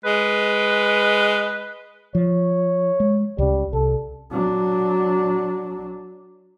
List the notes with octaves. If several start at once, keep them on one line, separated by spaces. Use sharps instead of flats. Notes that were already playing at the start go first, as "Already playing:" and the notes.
G#3 B4
F3 C#5
G#3
C#2 C#3 G3
C2 A4
F#3 D4